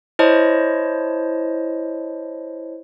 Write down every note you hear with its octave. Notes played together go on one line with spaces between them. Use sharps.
E4 C5 C#5 D#5 A5